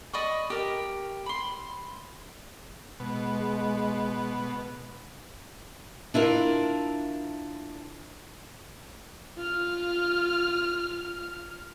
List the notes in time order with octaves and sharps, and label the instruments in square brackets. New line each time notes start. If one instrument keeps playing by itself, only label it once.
[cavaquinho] D5 D#5 B5 C#6
G4 A#4
B5 C6
[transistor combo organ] B2 [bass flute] G#3
[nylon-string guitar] D4 E4 F4 A#4
[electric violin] F4 F6